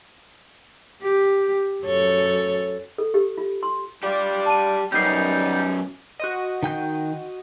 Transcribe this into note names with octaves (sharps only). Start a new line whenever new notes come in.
G4
F#2 A4 C#5
A4
G4
F4
C6
G3 D4 F4 G4 D5
A5 D#7
F#2 G3 B3 C#4 D#4 G6 C7
F#4 C5 D#5
D#3 G5 G6